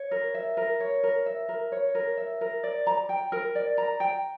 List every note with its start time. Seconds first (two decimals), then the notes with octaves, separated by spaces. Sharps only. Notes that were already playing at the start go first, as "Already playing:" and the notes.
Already playing: C#5
0.11 A#4
0.34 E5
0.57 A#4
0.80 C#5
1.03 A#4
1.26 E5
1.49 A#4
1.72 C#5
1.95 A#4
2.17 E5
2.41 A#4
2.64 D5
2.87 A#5
3.09 G5
3.32 A#4
3.55 D5
3.78 A#5
4.00 G5